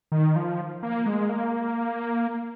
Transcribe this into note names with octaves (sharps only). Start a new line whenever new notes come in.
D#3
F3
A#3
G#3
A#3